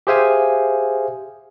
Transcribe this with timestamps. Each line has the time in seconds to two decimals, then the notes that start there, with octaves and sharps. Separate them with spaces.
0.07 G4 G#4 C5 E5 F5 G#5